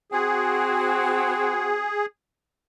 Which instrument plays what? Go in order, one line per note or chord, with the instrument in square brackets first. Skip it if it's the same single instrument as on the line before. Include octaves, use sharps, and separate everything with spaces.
[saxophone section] C4 F#4 [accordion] G#4